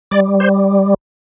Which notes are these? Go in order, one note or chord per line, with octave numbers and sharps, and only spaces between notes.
G3 D5
C5